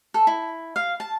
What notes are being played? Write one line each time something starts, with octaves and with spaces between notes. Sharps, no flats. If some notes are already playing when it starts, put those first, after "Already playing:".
A4
E4
F5
A5